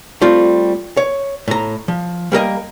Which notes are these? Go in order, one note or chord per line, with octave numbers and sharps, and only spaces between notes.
G3 A3 C4 F4
C#5
A2 A#5
F3
G3 A#3 A#4 D#5